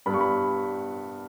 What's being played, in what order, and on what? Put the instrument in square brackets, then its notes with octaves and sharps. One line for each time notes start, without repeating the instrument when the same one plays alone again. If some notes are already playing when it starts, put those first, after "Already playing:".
[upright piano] G2 G3 B3 B5
C#6
B5